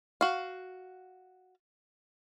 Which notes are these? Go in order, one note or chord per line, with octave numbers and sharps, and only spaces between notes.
F#4 F5